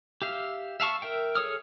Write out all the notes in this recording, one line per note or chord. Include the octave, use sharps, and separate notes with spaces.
G4 E5 F5
E5 F5 A5 C#6
A#4 E5 G5
G#4 A4 C#5 D#6 F6